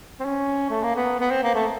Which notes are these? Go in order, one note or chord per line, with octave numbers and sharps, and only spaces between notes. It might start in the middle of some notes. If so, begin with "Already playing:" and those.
C4
C#4
A3
A#3
B3
B3
C4
A#3
A3